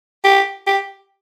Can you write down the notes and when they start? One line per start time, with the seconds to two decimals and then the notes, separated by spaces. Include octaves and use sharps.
0.24 G4
0.67 G4